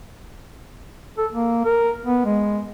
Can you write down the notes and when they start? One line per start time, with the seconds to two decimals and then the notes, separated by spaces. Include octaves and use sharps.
1.18 A4
1.33 A#3
1.65 A#4
2.06 B3
2.25 G#3